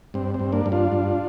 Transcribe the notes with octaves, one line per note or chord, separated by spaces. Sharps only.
G2 C4
C4
G2
A#3 D4
G2
D4 F4
G2